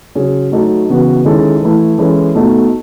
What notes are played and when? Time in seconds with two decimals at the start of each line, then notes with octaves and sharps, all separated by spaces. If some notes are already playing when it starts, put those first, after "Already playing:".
0.15 C#3 F#3 C#4 G#4
0.52 F#3 A3 D#4 A4
0.89 C#3 E3 B3 F#4
1.25 D#3 G#3 C#4 E4 A4
1.62 E3 A3 E4
1.98 E3 G#3 C#4 E4 A4
2.35 B2 A3 D#4 F#4 A4